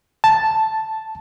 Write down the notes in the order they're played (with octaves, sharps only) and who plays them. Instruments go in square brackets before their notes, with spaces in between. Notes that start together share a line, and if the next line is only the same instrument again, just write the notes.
[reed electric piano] A5